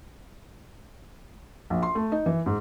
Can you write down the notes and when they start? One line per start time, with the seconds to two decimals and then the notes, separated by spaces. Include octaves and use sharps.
1.70 A#1
1.83 C6
1.95 A3
2.12 D#4
2.26 E3
2.46 G#2